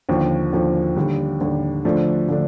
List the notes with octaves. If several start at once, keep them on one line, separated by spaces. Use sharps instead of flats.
D#2 D3 F3
D#2 D3 F3
D#2 D3 G3
D#2 D3 G3
D3 F3 A3 D4
D3 F3 A3 D4